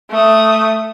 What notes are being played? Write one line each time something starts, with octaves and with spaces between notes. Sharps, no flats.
A3 D#6